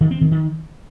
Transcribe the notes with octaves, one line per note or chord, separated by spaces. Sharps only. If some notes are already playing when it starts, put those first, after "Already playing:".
D#3
C4
D#3
D#3